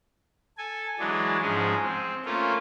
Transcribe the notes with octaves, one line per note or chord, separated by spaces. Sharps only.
A4 G#5
E3 F#3 G#3 D4
G#2 F3 G#3 C#4 G#4
C4
A3 A#3 C#4 F4